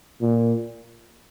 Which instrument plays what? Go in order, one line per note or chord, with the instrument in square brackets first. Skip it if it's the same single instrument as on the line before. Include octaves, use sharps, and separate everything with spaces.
[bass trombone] A#2